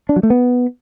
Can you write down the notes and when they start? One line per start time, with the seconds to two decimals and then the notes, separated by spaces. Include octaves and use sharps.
0.09 D4
0.16 F#3
0.23 A3
0.30 B3